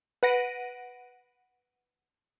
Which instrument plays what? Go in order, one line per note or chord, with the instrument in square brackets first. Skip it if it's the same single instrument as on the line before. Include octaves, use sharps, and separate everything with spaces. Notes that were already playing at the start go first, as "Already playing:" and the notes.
[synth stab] B4 F#5 A#6 D7 D#7